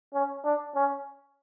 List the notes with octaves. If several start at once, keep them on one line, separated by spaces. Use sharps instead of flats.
C#4
D4
C#4